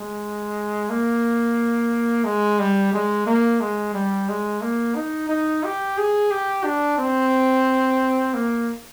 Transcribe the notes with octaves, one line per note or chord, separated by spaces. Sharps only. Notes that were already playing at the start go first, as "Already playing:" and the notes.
Already playing: G#3
A#3
G#3
G3
G#3
A#3
G#3
G3
G#3
A#3
D#4
D#4
G4
G#4
G4
D4
C4
A#3